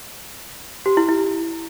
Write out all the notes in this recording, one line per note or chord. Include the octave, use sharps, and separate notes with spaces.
G4
E4
E4